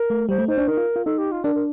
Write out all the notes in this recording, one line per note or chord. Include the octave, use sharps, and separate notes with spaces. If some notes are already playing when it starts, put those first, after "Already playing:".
Already playing: A#4
A3
G3 C5
A3
D#4 C5
D4
D#4 A#4
F4
F4
D#4 A4
G4
F4
D4 A#4
A#4